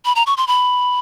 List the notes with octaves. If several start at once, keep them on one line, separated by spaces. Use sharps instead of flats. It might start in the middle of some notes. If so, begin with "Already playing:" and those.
B5
A#5
C#6
C6
B5